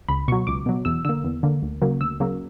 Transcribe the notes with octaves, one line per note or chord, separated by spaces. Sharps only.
C#2 B5
B2 F#3 C#6
C#2 D6
B2 F#3
E2 E6
D3 A#3 E6
E2
D3 A#3
D2
C#3 F#3 A#3
D2 E6
C#3 F#3 A#3